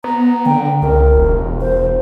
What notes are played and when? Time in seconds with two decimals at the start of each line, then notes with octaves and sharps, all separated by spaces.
0.04 B3 A#5
0.46 D3 G5
0.82 C#2 A#4
1.16 E1
1.61 C5